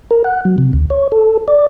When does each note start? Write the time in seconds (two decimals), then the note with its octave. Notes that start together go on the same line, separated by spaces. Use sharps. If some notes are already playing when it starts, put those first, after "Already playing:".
0.11 A#4
0.24 F#5
0.45 F#3
0.58 C3
0.73 D2
0.90 C#5
1.12 A4
1.48 D5